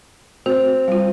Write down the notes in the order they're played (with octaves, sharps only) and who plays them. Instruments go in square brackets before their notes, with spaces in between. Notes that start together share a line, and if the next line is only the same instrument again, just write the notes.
[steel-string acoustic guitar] C4 [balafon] F#4 C5
[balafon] G3 F4